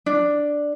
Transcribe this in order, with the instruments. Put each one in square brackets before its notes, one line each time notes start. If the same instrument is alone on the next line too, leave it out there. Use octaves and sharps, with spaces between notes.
[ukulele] D4